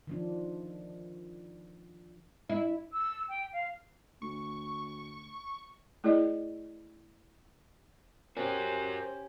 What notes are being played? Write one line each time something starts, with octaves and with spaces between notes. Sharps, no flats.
D#3 F3 D4
E4
E6
G5
F5
D2 C#6
A3 E4 G#4 D5 D#5
C#4 F#4 G4 A#4 C5